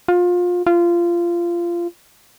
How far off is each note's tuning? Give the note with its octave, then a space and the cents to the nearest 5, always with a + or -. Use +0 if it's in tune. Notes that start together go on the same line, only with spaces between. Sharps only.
F4 +25
F4 -20